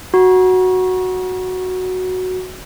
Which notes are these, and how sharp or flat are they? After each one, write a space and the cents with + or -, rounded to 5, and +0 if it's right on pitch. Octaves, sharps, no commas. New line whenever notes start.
F#4 +0 A#5 +40